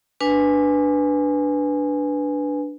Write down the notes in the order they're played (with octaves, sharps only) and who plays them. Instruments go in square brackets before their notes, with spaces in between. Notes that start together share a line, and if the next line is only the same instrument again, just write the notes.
[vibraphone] D4 B4 G#5